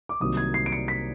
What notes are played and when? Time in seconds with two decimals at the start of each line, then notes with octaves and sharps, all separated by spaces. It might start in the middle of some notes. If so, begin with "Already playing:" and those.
0.09 D6
0.20 C2 C3 D#3 F#3 A#3 D#6
0.37 G#6
0.54 C7
0.66 D7
0.72 C#7
0.88 B6